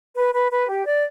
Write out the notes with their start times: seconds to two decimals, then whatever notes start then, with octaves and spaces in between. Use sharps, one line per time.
0.15 B4
0.33 B4
0.50 B4
0.67 G4
0.84 D5